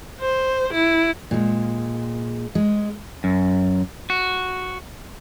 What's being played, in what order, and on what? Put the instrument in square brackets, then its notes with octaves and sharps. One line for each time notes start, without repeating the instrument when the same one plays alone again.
[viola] C5
E4
[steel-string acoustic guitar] A#2 G#3
G#3
[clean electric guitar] F#2
F#4